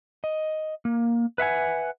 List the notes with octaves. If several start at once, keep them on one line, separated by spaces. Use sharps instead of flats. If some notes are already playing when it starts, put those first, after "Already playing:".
D#5
A#3
B4 E5 F#5 G#5